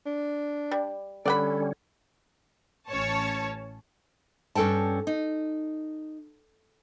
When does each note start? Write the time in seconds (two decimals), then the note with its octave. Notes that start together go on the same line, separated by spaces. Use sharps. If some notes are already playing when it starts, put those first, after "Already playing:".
0.06 D4
0.71 G3
1.25 D3 G3 C#4 A4 D5 F#5 B5
2.88 A1 C#4 C#5 A5
4.55 G2 C#4 A4 G5 A5
5.07 D#4